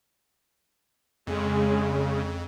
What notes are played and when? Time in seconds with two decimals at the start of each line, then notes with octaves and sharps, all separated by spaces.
1.27 F2 C#3 G#3